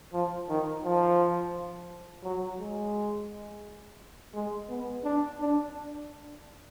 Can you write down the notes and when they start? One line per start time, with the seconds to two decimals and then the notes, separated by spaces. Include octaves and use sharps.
0.13 F3
0.49 D#3
0.84 F3
2.24 F#3
2.60 G#3
4.35 G#3
4.69 B3
5.04 D4
5.41 D4